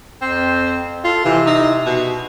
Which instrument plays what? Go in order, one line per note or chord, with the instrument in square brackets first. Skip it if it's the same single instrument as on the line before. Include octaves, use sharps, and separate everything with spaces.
[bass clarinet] F2 [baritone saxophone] C4
[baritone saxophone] F4 [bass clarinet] A4
[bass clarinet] C3 [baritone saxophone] E3
[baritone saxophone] D#4
B2